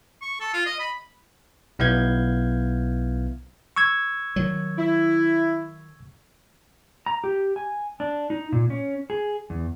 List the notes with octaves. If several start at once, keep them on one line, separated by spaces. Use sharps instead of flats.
C#6
A4
F4
D#5
B5
B1 B3 E4 F5 G6 G#6
C#6 E6 G#6
D#3 F#3
E4
A#5
G4
G#5
D4
D#4
A#2
C#4
G#4
E2